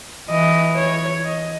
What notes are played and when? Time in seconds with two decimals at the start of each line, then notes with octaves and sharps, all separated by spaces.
0.29 E3 D#5
0.76 C#5
1.24 D#5